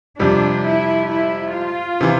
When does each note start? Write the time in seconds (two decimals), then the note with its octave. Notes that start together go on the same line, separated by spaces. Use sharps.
0.19 F2 C3 G3 D4
0.65 E4
1.09 E4
1.54 F4
2.01 C3 E3